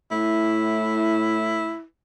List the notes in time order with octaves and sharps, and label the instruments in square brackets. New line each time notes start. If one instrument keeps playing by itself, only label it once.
[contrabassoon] A2 [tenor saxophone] E4